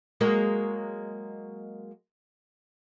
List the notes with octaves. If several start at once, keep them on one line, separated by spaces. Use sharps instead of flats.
F#3 G#3 A#3